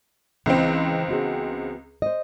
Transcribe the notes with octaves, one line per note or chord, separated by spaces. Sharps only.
C#2 E3 C4
B3 F#4 G#4
C5 D#5